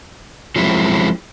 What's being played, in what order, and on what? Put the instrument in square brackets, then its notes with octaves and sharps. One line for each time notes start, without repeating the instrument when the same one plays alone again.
[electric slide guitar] F3 F#3 G#3 C4 E4